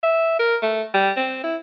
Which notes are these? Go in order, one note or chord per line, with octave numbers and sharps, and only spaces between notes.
E5
A#4
A3
G3
C4
E4